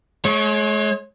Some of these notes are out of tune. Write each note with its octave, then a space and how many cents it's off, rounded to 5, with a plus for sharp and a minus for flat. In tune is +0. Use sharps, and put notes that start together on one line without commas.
G#3 +40 C#5 -10